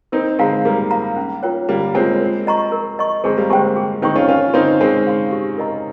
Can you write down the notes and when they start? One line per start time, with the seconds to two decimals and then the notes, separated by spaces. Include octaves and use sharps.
0.12 C4 D#4 A#4
0.39 G#3 C4 F5 A#5
0.65 G3 A#3 A#4
0.91 F5 A#5
1.16 C#4
1.43 F4 A#4 C#5 G5
1.69 G3 A#3 C#4
1.95 G#3 C4 F4 A#4 C#5 G5
2.20 A#4
2.47 D#5 A#5 C#6
2.72 A#4
2.99 D#5 A#5 C#6
3.24 G#3 C4 G#4
3.37 G3 A#3
3.50 G#3 C4 C5 G5 C#6
3.76 G#4
4.02 C4 D#4 C5 G5 C#6
4.16 C#4 F4
4.28 C#4 F4 A#4
4.54 C4 D#4 F5 C6
4.81 G#3 C4 A#4
5.07 F5 C6
5.32 G4
5.58 A#4 D#5 A#5